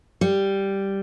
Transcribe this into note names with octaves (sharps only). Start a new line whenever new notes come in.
G3